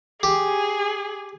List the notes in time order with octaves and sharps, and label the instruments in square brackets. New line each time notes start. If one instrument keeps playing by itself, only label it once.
[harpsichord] G4 [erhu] G#4